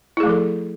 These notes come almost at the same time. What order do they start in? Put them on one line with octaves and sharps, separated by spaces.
E4 G#4 A3 F3 A4